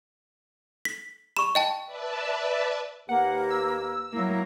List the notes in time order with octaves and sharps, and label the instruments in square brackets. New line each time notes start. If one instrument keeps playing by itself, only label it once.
[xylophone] B6
[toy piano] B5 C#6 [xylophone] E7
[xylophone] D#5 G5 A5
[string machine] B4 D5 E5 A5
[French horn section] D#2 G4 B4 [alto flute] A#3 [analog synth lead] F#5
[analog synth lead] E6
[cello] F#3 A#3 [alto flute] E4